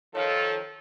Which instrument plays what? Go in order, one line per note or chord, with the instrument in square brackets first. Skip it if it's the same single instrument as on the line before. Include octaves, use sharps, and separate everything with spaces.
[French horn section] D#3 F3 A4 [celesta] C#5 F5 F6